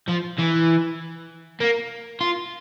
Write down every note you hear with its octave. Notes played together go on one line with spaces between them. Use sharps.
F3
E3
A#3
F4